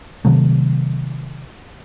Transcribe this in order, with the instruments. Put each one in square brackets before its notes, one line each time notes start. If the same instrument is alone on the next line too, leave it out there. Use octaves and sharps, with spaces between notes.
[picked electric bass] C3 D#3 F#3 A3